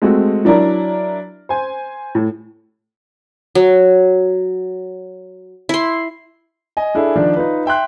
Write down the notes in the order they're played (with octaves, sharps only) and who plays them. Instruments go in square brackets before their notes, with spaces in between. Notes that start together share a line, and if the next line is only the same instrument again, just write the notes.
[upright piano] G#3 A3 C4 F#4
F#3 D4 E4 A#4
C5 G#5
A2
[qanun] F#3
E4 C6
[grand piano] D#5 G#5
D4 E4 G#4 A4
D#3 F3 D4 D5
D#4 F4 B4
E5 G5 C6 F#6